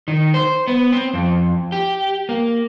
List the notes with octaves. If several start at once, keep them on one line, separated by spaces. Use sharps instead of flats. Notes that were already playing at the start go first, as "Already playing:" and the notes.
D#3
C5
B3
C4
F2
G4
A#3